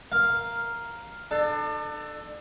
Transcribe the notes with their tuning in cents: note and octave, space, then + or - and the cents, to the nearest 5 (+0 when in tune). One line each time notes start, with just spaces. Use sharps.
A#4 +0 F5 +0
D4 +35 A4 +0